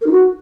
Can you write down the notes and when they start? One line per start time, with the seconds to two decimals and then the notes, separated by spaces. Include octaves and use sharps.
0.01 A#4
0.06 D#4
0.11 F#4